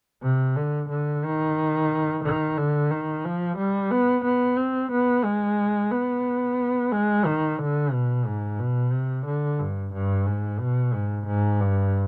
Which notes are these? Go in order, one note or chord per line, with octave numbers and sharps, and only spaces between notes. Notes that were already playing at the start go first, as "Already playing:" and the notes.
C3
D3
D3
D#3
D#3
D3
D#3
F3
G3
B3
B3
C4
B3
G#3
B3
G#3
D#3
D3
B2
G#2
B2
C3
D3
G2
G2
G#2
B2
G#2
G#2
G2